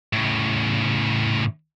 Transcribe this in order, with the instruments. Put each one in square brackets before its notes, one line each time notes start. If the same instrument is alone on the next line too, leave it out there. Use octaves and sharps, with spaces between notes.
[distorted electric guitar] A2 C#3